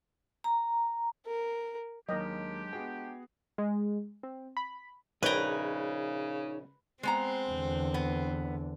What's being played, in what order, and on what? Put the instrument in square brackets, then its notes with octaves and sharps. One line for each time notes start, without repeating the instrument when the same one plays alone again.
[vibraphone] A#5
[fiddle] A#4
[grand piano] D#2 A#4 G5 [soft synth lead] F#3 [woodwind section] G#3 D4 G4 [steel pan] D#5
[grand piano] B3 F#4 G#4 [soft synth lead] G5
[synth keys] G#3
C4
B5
[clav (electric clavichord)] A#1 G5 [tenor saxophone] C#3 [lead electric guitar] D#4 C#5 [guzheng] B4 A#5
[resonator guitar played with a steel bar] G#3 B3 A#5 [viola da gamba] C4
[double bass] E2 D3
[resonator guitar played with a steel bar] B3